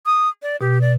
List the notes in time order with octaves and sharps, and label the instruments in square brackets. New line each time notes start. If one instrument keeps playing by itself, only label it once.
[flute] D#6
D5
[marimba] B2 [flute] G4
[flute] D5